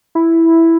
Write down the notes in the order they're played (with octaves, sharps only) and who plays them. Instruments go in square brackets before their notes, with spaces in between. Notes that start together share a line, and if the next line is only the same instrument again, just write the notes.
[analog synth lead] E4